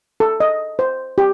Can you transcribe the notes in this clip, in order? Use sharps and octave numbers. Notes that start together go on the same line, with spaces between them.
A4
D#5
C5
G4